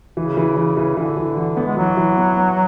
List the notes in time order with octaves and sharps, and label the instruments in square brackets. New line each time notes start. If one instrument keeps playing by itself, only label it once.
[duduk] C#3 [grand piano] E3
[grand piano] E3
E3
E3
[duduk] D3 [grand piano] E3
[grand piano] E3
E3
B3
[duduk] G#3
[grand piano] E3 [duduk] F#3
[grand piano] E3
B3
B3